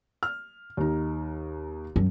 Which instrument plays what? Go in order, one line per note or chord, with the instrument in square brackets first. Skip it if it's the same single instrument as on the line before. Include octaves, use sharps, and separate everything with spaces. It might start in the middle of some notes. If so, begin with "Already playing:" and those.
[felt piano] F6
D#2 D#4
[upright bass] F#2